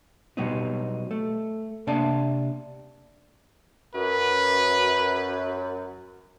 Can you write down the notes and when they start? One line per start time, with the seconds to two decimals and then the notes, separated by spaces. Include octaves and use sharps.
0.37 B2 F#3 G3 B3 C4 D#4
1.11 A3
1.87 C3 A#3 D4 D5 E5 A5
3.94 F#2 B4